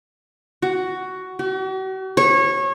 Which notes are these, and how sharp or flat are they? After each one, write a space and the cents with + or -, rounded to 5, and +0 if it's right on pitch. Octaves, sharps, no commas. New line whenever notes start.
F#4 +10
F#4 +45
C#5 -25